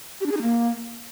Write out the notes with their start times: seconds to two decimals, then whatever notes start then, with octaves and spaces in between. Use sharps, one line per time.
0.21 G4
0.26 D4
0.31 G#4
0.37 D#4
0.42 A#3